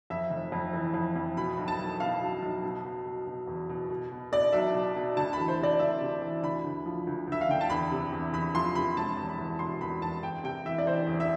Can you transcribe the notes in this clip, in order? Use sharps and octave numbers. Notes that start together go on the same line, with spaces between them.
F2 E5
F1
F2
E3
F2
F2
B2 B5
B1
A5
B1
B2 F5
B1
B1
B2
B2
B2
B2
E2
B2
B2
B2
B2 D5
B1 E5
B2
B2
D2 A5
E3 B5
C5
C3 D5
D2 E5
C3
E3
D2 B5
D2
F3
D2
D2 E5
F5
D3 G5
A5
E2 B5
C3
E2
E2 B5
F3 C6
C3 B5
E1 A5
E2
B5
E2
B2 C6
E2 B5
E2 A5
E2 G5
C3 G5
E3 E5
D5
E3 C5
E2
E5